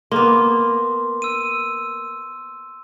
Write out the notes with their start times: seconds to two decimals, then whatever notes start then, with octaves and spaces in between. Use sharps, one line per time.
0.12 A#3 B3 C6 D6
1.22 E6 D#7